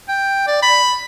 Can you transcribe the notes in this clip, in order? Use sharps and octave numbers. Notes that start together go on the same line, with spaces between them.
G5
D5
B5